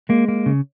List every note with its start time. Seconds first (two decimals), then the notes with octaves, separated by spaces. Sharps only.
0.09 G#3 A#3
0.28 A#3
0.46 C#3